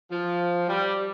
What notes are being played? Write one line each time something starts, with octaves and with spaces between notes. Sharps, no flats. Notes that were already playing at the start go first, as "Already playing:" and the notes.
F3
G3